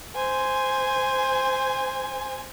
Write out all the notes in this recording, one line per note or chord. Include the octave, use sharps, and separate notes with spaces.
C5 G#5